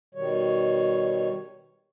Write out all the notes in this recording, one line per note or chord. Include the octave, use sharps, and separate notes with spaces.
B2 D#3 G3 C#5